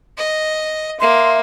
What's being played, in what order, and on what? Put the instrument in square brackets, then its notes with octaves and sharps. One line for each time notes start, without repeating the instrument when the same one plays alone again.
[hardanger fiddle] D#5
[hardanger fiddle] A#3 [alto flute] E5 [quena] C6